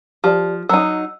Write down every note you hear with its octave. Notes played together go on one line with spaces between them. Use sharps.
F3 G4 D5
F#3 D#4 E6